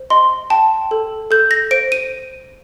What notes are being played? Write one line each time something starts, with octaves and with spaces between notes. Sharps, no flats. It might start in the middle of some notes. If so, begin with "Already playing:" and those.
Already playing: C5
D#5 C6
G5 A5
A4
A4 G6
A#6
C5 D7
D#7